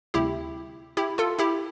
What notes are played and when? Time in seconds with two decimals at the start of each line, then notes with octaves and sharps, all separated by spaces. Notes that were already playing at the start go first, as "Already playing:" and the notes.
0.14 D2 C3 G3 E4 G4
0.97 E4 G4
1.18 F4 A4
1.39 E4 G4